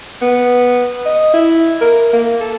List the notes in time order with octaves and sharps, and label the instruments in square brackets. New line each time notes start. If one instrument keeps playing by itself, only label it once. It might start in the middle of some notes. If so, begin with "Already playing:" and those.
[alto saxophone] B3
D#5
E4
A#4
A#3
A4